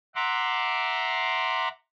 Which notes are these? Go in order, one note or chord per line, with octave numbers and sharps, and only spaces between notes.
E5 F#5 A#5 C6 D6